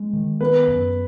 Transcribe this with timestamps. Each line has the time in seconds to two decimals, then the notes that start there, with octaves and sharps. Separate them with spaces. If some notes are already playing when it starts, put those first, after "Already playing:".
Already playing: G#3
0.13 D#3
0.41 B3 B4
0.67 F#2